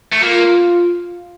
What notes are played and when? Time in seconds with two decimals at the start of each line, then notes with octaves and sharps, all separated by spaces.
0.13 A3
0.23 A#3 F4